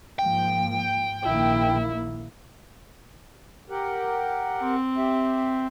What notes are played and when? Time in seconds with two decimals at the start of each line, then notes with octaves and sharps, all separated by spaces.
0.19 G#2 F3 A#3 G5
1.24 A#1 D#3 A#3 E4
3.70 G4 A#4 F#5
4.61 C4
4.97 G4 E5